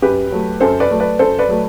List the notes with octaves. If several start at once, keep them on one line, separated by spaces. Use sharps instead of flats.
F#2 G4 B4
F#3 A3
F#2 A4 C5
B4 D5
F#3 A3
B4 D5
F#2 A4 C5
B4 D5
F#3 A3